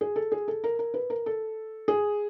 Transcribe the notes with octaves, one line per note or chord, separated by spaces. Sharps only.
G#4
A4
G#4
A4
A#4
A#4
B4
A#4
A4
G#4